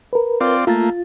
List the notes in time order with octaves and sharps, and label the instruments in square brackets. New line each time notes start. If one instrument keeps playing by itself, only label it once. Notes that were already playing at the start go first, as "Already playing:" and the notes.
[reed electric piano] A#4 B4
[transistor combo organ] C4 F4 D5
[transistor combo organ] A3 A#3 [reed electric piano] F4 A6